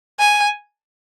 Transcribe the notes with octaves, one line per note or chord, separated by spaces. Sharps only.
G#5